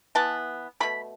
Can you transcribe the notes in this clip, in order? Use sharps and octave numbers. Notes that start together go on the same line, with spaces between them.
E3 B3 A5
B2 A3 B5